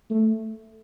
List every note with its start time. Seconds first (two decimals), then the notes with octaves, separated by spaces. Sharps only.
0.10 A3